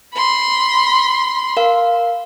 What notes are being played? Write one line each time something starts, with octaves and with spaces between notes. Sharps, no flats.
B5 C6
A#4 F5